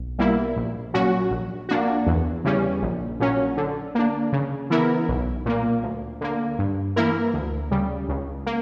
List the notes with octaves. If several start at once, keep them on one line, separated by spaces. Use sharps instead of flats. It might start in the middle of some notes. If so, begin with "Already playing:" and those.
Already playing: B1
B2 G3 A#3 E4
A#1
A#2 F#3 C#4 F#4
A#1
A#2 A#3 D4 F#4
E2
C#3 E3 G3 C#4
A#1
A#2 F#3 C#4
D3
A#3 D4
C#3
E3 B3 E4 A#4
B1
A#2 A#3
D2
D3 A#3
G2
E3 A#3 E4 A#4
D2
C#3 G3
C#2
A#3